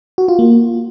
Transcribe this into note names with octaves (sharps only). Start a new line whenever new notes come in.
F#4
F4
A#3